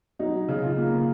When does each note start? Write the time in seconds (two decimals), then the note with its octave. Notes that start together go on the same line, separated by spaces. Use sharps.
0.19 F#3 D#4
0.48 C#3
0.63 F4
0.78 A#3